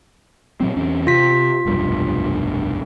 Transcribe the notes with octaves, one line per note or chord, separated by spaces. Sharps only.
A#2 F#3 C4
E2 C4 C#4
C3 F4 B6
F1 B1 G2